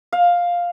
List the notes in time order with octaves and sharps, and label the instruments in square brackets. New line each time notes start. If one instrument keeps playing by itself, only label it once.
[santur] F5